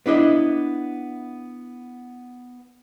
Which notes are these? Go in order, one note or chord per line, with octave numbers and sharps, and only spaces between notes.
B3 D4 E4 D#5